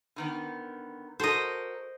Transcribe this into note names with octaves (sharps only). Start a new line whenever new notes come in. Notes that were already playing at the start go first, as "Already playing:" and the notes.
D3 D#3 B3
F#4 A4 A#4 C5 D#5